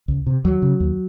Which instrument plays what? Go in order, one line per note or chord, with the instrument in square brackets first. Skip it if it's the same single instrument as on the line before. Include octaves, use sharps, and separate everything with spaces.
[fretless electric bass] C#2
C3
D#2 F#3
C#3
D#2